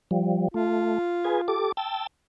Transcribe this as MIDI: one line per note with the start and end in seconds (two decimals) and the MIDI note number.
0.11 0.48 53
0.11 0.48 55
0.54 0.98 57
0.54 1.66 65
1.24 1.41 68
1.24 1.41 71
1.24 1.41 80
1.48 1.72 67
1.48 1.72 69
1.48 1.72 86
1.77 2.07 79
1.77 2.07 81
1.77 2.07 88